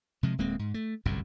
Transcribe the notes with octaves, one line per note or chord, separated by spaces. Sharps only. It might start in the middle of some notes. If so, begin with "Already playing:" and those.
C3 F3 G#3
D1 G#3 A#3 C4
G#2
A3
G1 C2 F#2 A2